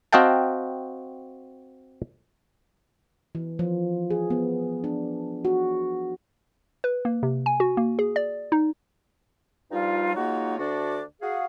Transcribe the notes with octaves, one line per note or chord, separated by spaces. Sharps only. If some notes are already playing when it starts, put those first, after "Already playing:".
C4 F#4 D#5 F5 G5 A5
E3
F3
G#4
B3
D4
F#4
B4
A#3
C3
G#5
F#4
A#3
G#4
D5
D#4
G2 F3 G3 D#4 F4
F#3 G#3 A#3 D#4 F4 F#4
D2 D3 D4 F#4 D5 D6
F#4 G#4 F5